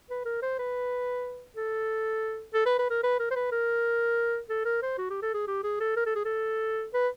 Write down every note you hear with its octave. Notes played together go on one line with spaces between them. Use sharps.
B4
A#4
C5
B4
A4
A4
B4
B4
A#4
B4
A#4
C5
B4
A#4
A4
A#4
C5
F#4
G4
A4
G#4
G4
G#4
A4
A#4
A4
G#4
A4
B4